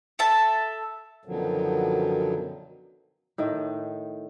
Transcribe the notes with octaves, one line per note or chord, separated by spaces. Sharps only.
A4 E5 A5
F#2 B2 D3 D#3 F3 F#3
A2 D#3